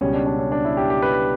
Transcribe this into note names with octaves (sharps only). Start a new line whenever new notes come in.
C#2 B2 G3 C#4
D4
D4
C#4
D4
E4
G4
G4
B4